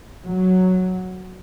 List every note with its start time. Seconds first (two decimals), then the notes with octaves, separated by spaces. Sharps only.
0.24 F#3